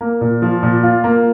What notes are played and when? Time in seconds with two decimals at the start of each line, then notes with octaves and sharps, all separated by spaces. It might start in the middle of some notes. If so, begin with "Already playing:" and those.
0.01 A#3
0.21 A#2
0.42 F3
0.63 A#2
0.83 F4
1.04 A#3